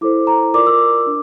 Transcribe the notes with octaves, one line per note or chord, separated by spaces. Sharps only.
E4 A4 C5 D6
A#5
F4 A#4 D5 D6
E6
D6
D4